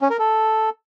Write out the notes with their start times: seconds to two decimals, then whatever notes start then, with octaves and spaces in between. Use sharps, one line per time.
0.01 C#4
0.10 A#4
0.19 A4